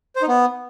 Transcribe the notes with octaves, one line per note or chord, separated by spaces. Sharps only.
C5
D#4
B3